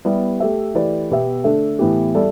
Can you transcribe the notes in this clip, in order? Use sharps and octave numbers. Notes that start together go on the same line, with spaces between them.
G3 B3 E4 G4 D5
A3 G4 E5
E3 A3 G4 B4 D5
B2 B3 G4 E5
D3 A3 D4 A4 E5
A2 E3 B3 G4
G3 E4 A4 D5